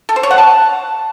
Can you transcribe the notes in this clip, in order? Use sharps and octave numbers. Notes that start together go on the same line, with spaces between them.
A4
C5
C#5
F#5
A5